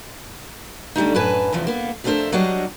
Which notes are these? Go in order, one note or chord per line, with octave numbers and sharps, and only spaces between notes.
D3 G3 A3 D#4
F#2 A2 B4 G#5 A5
E2 C3 E3 F3
A#3 B3
F2 A3 D4 A#4 C5 E5
F#3 G3 D4 C#5 D#5